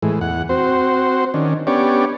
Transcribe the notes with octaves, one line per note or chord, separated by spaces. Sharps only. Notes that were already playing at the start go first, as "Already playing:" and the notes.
A2 E3 G#3
E2 F#5
C4 F#4 C5
D#3 C#4 D4
B3 C#4 D4 G4 C#5 D5